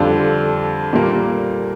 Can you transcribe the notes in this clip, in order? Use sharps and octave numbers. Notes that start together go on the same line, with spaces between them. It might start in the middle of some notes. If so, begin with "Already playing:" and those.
Already playing: F2 D3 G3 D4 F4
A#2 G3 A#3